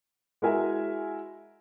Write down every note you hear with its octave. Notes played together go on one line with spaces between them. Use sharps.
G#3 E4 F#4 A#4 E5 G#5